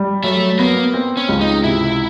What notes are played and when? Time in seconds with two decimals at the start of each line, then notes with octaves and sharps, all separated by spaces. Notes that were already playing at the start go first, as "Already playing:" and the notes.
Already playing: G3
0.24 F#3 A3
0.59 A#3 B3
0.94 C4
1.17 C#4
1.29 C#2
1.41 D#4
1.64 C3 E4